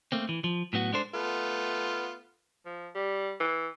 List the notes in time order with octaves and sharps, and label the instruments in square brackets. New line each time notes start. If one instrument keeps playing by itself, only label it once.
[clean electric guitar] A3 A#3 C4
E3
F3
A2 F#3 B3 F#4
G#3 D4 A4 C5
[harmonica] A3 B3 F4
[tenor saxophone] F3
G3
E3